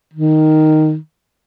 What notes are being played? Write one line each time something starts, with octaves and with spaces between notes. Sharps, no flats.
D#3